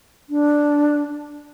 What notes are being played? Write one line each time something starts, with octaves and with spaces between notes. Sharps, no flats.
D4